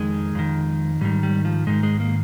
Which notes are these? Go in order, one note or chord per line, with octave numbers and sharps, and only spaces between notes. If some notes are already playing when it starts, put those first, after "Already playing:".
Already playing: F2 D#3 G#3
F2 D#3
G#2 D#3 G3
G3
F3
G#2 D#3 G#3
G#3
A#3